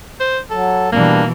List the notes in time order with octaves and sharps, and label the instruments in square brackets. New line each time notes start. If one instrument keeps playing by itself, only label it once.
[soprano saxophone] C5
[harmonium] F#3 [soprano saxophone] A4
[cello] B2 E3 [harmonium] G3 D4 [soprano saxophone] A#3